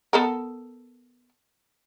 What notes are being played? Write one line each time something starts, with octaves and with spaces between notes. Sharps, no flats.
B3 A4 A#4